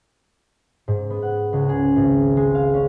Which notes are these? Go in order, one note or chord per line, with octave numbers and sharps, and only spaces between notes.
G#2
B3
F#5
C#2
G#4
G#1
G#3
F5
C#4